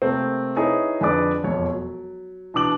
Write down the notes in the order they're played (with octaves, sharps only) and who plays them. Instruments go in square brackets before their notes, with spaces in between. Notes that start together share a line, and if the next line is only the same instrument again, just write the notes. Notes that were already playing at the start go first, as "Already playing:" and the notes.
[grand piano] C3 A3 A#3 C4
D#4 E4 G#4 B4 C#5
F2 D3 G#4 B4 D5 D6
E1 F2 C#5
F#3
B2 E3 D4 D6 F#7